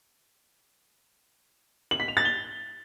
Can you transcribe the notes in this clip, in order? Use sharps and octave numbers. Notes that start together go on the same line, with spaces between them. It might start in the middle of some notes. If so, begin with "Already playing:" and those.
F#7
B6
F7
A6
G7